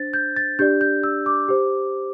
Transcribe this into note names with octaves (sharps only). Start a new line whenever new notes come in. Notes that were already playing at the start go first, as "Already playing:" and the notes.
Already playing: D4 C5 A6
G6
A6
D4 G4 D5 G6
G6
E6
D6
G4 C5